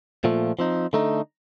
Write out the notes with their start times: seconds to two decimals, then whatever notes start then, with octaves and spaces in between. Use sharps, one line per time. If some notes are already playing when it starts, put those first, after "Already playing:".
0.24 A#2 F3 A3
0.59 F3 C4 D#4
0.93 D3 A3 D#4